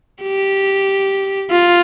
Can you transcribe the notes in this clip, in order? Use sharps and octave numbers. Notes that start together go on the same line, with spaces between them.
G4
F4